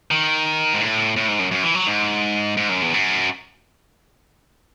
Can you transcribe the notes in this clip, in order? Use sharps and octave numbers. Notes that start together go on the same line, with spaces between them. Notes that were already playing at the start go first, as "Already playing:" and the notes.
D#3
G#2
A2
A2
G#2
F#2
F#2
E3
F#3
G#2
G#2
F#2
E2
F#2